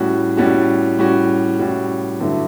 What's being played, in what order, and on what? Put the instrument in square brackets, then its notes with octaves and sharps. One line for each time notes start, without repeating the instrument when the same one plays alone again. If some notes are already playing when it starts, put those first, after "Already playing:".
Already playing: [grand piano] A2 G3 C#4 F#4
A2 G3 C#4 F#4
A2 G3 C#4 F#4
A2 G3 C#4 F#4
G2 D3 F#3 A3 E4